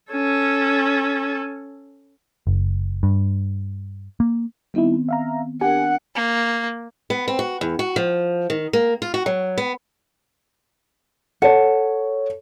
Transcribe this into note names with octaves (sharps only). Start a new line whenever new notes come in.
C#4 A4
F#1
G2
A#3
D#3 G3 B3 C4 D#4 E4
E5 F5 A#5
D4 G4 A#4 F#5 G#5
A#3
B3
C4
F#4
E2
F#4
F3
D#3
A#3
F4
F#4
F#3
B3
A4 C#5 F#5 A5